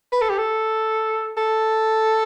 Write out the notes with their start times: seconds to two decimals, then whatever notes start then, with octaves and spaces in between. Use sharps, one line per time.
0.13 B4
0.22 A4
0.30 G4
0.39 A4
1.37 A4